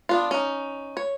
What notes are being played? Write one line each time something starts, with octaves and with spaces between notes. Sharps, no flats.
B3 D4 F4
C#4 D#4
C#5